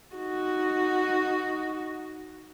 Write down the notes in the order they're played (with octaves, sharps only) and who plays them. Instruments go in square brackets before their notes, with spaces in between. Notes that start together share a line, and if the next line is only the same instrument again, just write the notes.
[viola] D#4 F#4